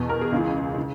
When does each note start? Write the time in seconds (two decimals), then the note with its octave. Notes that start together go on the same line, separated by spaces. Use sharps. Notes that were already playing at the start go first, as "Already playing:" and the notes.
Already playing: E2 B2
0.09 A#4
0.21 G#4
0.32 C#2 C#3 E3
0.78 C#3